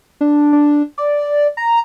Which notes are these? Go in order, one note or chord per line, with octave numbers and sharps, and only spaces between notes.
D4
D4
D5
A#5